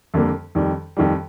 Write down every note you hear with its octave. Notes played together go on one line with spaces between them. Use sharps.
F2 D3 G3 A#3
F2 D#3 G3
F2 D#3 G3